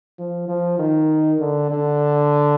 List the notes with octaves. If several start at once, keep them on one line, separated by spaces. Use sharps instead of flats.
F3
F3
D#3
D3
D3